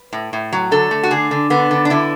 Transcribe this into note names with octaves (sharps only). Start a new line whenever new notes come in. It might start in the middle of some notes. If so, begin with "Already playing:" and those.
Already playing: B4
A2
A2
F#3
D3 A4
A3
F#4
D3 G#4
D3
D3 B3
D3
D4
D3 E4